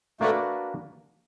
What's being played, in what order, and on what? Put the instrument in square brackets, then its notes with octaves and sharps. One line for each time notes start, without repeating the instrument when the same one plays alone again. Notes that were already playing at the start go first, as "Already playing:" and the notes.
[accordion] A3 [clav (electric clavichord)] A#3 D4 F#4 B4 D5